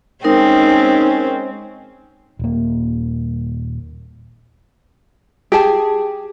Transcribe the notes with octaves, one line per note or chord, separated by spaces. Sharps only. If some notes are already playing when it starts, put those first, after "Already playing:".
G#3 C4 C#4 D#4 A#4
D#1 A#3
G4 G#4 A5